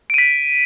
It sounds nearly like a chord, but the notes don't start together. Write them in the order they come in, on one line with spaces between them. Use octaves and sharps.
D7 D#7 B6